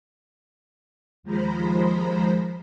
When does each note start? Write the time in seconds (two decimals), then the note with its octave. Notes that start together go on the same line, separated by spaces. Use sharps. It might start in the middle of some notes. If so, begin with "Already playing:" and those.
1.23 D#2 F3 G#3 C5 A#5 B5